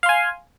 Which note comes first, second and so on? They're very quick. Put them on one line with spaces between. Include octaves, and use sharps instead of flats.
F5 C6 G#5